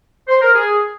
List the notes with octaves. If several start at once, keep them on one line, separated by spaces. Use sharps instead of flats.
C5
A#4
G#4